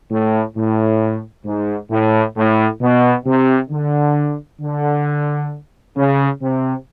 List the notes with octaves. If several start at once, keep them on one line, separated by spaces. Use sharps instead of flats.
A2
A2
G#2
A2
A2
B2
C3
D3
D3
C#3
C3